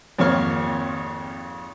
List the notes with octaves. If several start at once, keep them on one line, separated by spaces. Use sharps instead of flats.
G#1 F2 A#3 C#5 F6